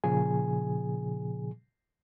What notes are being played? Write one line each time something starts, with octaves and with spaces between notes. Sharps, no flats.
A#2 C#3 F3 G#4 G#5